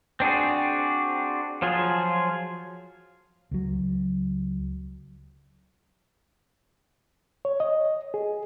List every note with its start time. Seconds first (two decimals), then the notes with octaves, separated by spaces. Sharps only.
0.20 C4 D4 F#4 G#4
1.62 F3 F#3 F4 G#4
3.51 C#2 F#3
7.45 C#5
7.60 D#5
8.14 G#4